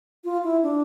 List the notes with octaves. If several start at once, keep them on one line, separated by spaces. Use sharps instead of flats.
F4
E4
D4